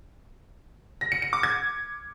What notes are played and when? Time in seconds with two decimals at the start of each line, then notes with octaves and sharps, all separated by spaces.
1.01 A#6
1.12 C#7
1.22 C#7
1.33 D6
1.43 G#6